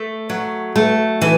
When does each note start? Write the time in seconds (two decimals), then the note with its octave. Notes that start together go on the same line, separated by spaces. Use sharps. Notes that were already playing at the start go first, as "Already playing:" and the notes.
Already playing: A3
0.30 F#3
0.76 A3
1.22 E3